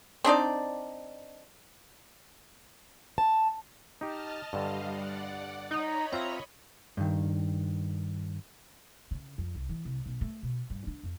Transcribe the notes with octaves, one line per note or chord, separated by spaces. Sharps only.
C4 D4 D#4 D5
A5
D#4 G4 D#5 A5 F6
G2 D3 G3 D#5 F5
D5 F#5
D#4 C#5 D#5 B5
C4 F4 E5 A#5
G2 D#3
C#3
F2
C2
E3
C2
B1
A3
B2
G2
D4
F2